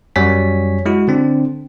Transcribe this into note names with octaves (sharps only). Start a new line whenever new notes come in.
F#2 F#3 G3 C#5 G#5 B6
G#3 E4 F#4
D3 C4 D4